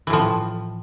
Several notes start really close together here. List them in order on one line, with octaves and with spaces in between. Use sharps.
E3 A2 F3